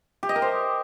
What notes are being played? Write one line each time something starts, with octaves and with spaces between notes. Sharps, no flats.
G4
D#5
A#4
C5